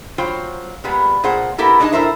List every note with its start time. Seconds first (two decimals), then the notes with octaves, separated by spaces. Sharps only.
0.18 F#3 F4 C5 G5
0.84 A#2 G3 G#3 B3
1.24 A#2 G#4 C5 F#5
1.58 A#3 B3 E4 G4 A4 A#4
1.80 G#3 D4 D#4 G#4 D#5 A5
1.92 A#2 E4 A4 A#4 C5 E5